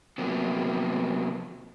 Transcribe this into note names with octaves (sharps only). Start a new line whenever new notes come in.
C3 F3 F#3 A#3 B3